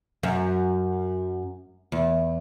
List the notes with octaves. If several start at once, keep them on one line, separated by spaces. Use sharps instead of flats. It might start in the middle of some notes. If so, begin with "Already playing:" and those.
F#2
E2